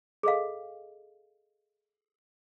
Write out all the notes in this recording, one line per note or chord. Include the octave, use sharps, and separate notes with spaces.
G#4 A4 D#5 F5